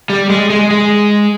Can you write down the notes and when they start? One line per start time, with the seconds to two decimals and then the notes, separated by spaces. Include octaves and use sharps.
0.10 G3
0.30 G#3
0.50 G#3
0.71 G#3